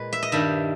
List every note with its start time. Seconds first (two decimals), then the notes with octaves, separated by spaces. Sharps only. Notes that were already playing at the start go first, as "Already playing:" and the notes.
Already playing: A#2 G#3 B4
0.13 E5
0.23 D#5
0.32 G2 D#3 G3 E5